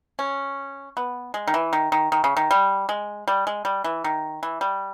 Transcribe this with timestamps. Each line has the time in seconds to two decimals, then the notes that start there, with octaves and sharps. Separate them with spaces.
0.19 C#4
0.97 B3
1.34 G#3
1.47 D#3
1.54 E3
1.73 D#3
1.92 D#3
2.12 D#3
2.24 C#3
2.37 D#3
2.51 G3
2.89 G#3
3.28 G3
3.47 G#3
3.65 G3
3.84 E3
4.04 D#3
4.43 E3
4.61 G3